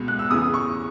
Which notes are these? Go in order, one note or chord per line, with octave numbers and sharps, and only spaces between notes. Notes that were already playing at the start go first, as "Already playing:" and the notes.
Already playing: C#2 B2
F#6
E6
E2 C#3 E3 D#6
C#6